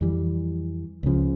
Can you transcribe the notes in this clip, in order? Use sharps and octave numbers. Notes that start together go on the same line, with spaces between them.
F2 E3 G3
C#2 C#3 F3